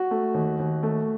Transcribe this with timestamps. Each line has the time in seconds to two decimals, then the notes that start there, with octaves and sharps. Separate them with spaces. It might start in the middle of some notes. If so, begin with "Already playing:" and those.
Already playing: F#4
0.11 A3
0.34 D#2
0.59 D#2
0.83 A3